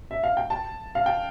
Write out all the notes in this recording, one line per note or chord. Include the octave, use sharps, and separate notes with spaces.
E5
F5
G5
A5
F5
G5